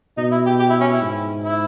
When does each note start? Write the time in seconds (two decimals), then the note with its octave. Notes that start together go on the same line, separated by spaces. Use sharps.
0.17 B2 D#4
0.31 E4
0.46 G4
0.59 G4
0.70 E4
0.80 C#4
0.91 E4
1.01 G#2
1.43 E4